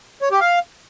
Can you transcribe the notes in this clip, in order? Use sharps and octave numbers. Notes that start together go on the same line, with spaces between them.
C#5
G4
F5